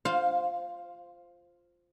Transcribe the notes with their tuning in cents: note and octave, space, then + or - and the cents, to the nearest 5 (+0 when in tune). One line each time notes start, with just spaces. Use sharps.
F4 +0 C5 +0 F5 +25